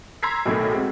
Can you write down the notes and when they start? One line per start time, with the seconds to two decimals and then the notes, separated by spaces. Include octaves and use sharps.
0.23 A#5 C6 E6 G#6 B6 C7
0.45 B1 A2 D#3 A3
0.72 G#3 C4 F#4